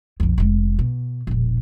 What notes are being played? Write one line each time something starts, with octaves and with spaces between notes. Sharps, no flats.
B1 F2
F1 G#3
B2
E1 A#1